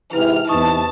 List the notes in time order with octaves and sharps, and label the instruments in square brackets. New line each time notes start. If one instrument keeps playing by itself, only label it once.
[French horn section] G#2 C3 E3 [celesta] E4 [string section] F6
[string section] E2 A5 [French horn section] C3 E3 D#4 [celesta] C#6 D#6